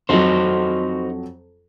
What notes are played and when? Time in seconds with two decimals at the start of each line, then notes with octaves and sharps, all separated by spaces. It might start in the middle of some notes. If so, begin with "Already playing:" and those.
0.09 F2 F#3 D#4 F#4 C5